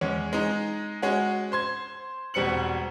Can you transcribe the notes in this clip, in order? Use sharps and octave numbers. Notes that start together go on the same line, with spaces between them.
E2 G#3 C#4
G#3 D#4
G#3 C#4 F#4
C5 C6 G#6
E1 B2 G3 C4 C#7 F#7